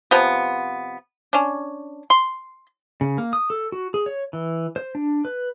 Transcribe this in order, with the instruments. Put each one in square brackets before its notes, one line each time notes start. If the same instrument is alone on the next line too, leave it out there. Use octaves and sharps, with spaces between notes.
[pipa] C3 F3 B3
C#4 D4
C6
[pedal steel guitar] C#3
A#3
D#6
A4
F#4
G#4
C#5
E3
C5
D4
B4